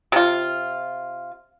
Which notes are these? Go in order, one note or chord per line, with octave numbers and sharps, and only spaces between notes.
C3 F4